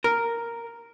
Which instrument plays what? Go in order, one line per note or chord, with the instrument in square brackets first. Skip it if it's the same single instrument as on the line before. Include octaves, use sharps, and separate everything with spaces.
[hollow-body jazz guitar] A#4